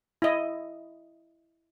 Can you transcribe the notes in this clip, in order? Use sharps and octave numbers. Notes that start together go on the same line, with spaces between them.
E4 D#5